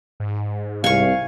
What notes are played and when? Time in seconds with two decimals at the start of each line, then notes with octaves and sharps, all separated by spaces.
0.20 G#2
0.84 C2 F5 G#5 C#6